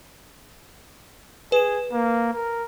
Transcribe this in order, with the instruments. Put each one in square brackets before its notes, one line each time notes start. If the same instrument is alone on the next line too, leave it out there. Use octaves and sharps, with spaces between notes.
[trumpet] G#4 [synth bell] B4 E7
[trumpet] A#3
A#4